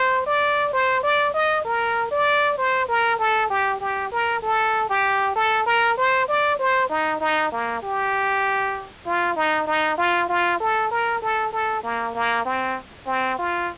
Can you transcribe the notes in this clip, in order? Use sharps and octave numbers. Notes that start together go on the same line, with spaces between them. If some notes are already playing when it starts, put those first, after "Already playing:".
Already playing: C5
D5
C5
D5
D#5
A#4
D5
C5
A#4
A4
G4
G4
A#4
A4
G4
A4
A#4
C5
D5
C5
D#4
D#4
A#3
G4
F4
D#4
D#4
F4
F4
A4
A#4
A4
A4
A#3
A#3
C4
C4
F4